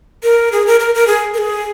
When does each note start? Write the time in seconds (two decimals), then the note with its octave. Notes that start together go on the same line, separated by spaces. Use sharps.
0.23 A#4
0.52 G#4
0.67 A#4
0.80 A#4
0.95 A#4
1.07 G#4
1.34 A#4
1.38 G#4